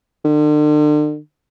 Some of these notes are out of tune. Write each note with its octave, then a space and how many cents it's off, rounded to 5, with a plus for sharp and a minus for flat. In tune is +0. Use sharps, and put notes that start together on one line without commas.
D3 +40